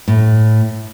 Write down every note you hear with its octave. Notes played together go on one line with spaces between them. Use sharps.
A2